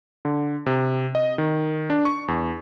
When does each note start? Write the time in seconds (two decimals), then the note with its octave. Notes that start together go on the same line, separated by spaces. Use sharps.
0.25 D3
0.66 C3
1.15 D#5
1.38 D#3
1.90 D4
2.05 C#6
2.28 E2